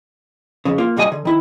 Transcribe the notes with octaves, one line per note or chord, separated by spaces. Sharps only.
F2 C#3
A#3 F4
C2 G#2 G3 F#4 D#5 G#5
D3
D#3 E4